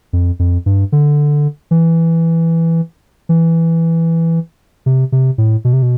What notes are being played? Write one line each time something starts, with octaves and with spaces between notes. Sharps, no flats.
F2
F2
G2
D3
E3
E3
C3
C3
A2
B2
C3
B2